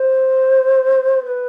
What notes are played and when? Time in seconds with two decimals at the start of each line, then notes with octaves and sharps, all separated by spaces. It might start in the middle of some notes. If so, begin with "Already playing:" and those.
Already playing: C5
1.26 B4